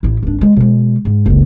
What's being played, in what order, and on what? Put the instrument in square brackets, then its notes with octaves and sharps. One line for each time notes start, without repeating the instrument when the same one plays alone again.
[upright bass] A1 E4
G#1 D4
G#3
B2 G#3
G#2
F#1 C#2